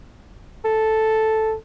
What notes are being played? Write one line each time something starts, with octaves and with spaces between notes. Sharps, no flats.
A4